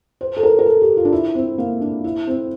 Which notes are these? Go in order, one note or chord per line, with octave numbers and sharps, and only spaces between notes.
C5
A4
A#4
A#4
A4
G4
F4
D4
E4
C4
A#3
D4
E4
C4